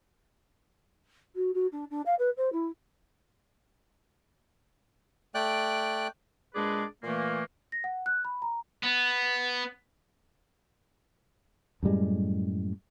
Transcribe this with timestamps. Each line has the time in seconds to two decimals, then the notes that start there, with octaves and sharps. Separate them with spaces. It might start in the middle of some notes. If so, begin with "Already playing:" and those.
1.35 F#4
1.54 F#4
1.72 D4
1.90 D4
2.05 F5
2.19 B4
2.37 C5
2.52 E4
5.35 A3 D5 G5 F#6
6.55 A#2 G#3 D4 G#4 B4 D5
7.03 A#2 E3 A3 A#3
7.72 A#6
7.84 F#5
8.06 F#6
8.25 B5
8.42 A#5
8.83 B3
11.83 F#2 A2 G3 G#3